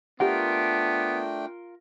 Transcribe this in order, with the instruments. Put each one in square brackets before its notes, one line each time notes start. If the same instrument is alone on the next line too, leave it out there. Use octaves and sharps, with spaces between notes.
[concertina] A3 D4 G5 [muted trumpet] B3 [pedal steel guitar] F4 A#4 [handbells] G4 F#5